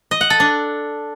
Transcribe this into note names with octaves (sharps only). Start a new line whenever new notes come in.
D#5
F#5
A4
D4